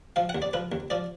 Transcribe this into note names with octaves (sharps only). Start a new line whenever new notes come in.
F3 F5
F#5
D#2
D5
F3 B4
D#2
F3 D5